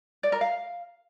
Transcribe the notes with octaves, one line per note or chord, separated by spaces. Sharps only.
D5
A#4
F5